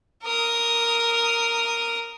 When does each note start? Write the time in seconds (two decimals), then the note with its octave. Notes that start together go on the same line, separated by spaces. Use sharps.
0.23 A#4 D#6